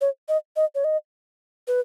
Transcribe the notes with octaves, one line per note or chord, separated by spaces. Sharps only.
C#5
D#5
D#5
C#5
D#5
B4